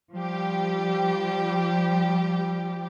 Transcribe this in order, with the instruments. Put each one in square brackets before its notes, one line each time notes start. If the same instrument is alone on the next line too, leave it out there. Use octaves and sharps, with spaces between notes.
[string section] F3 G3 G4